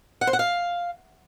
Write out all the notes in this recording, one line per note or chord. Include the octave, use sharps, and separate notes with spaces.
F#5
C5
F#5
F5